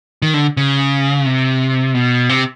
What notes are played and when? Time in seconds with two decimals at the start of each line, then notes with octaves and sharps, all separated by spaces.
0.22 D#3
0.34 D3
0.57 C#3
1.26 C3
1.95 B2
2.29 C3